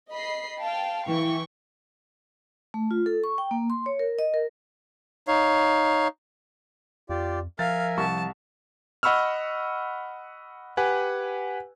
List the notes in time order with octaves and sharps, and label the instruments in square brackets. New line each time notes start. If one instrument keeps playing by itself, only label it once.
[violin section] D#5 B5 C7
F5 G5 A5
[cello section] E3 [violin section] G5 C#6
[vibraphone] A3
F4
A4
C#6
G5
A#3
C6
C#5
A#4
D#5
A#4
[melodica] D#4 C#5 F5
[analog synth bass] F2 [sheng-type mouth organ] F4 G4 D5
[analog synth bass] F3 [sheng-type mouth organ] A#4 E5 G#5 [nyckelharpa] F5 [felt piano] A6
[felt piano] C2 C#6 [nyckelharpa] A5
[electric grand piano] D#5 F#5 B5 C#6 E6 F6
G4 B4 F#5 G#5